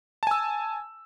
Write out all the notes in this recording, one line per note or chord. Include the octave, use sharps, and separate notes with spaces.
G#5 A5 E6